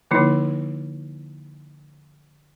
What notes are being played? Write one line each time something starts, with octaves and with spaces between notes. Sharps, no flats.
D3 F3 A#3 D#4 E4